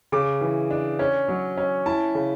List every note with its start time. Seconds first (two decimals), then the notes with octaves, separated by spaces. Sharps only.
0.12 C#3 D6
0.41 E3
0.71 D4
0.99 C#4
1.28 F#3
1.57 C#4
1.86 E4 A5
2.15 C#3